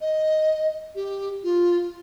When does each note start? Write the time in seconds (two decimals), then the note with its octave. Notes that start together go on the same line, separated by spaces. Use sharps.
0.01 D#5
0.95 G4
1.44 F4